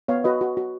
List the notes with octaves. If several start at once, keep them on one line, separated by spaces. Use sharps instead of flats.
B3 C#5 F5
F#4 B4 D#5
F#4
F#4